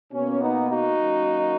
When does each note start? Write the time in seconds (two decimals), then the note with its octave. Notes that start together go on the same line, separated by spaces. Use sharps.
0.12 B2 A#3 C#4
0.40 B3 D#4
0.68 D#4 F#4
0.98 F#2 D#3 A#3